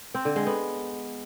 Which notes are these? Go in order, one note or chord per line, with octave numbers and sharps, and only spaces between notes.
C4
D3
G#3
B3